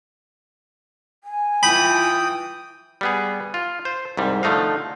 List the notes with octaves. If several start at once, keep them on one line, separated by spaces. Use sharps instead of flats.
G#5
E3 F4 G5 B5 D#6
G3 B3 G#4
F4
C5
C2 G#2 G3
D3 F3 A3 D#4 F5